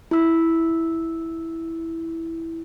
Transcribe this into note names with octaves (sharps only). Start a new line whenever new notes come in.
E4 E6